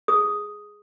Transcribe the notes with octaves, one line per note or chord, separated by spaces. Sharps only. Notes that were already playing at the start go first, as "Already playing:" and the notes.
G#4 D#6